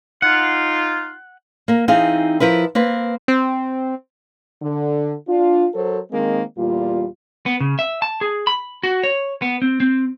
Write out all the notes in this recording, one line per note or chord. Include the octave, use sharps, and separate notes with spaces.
D#4 F4 F#5
A#3 A#4
E3 C4 D#4 G#4 F5
F3 E4 A#4 B4
A#3 C4 B4
C4
D3
D4 F4
F#3 A4 A#4 C5
D#3 G#3 A#3 C4
E2 A#2 G3 F4
B3
C#3
E5
A5
G#4
B5
F#4
C#5
B3
C4
C4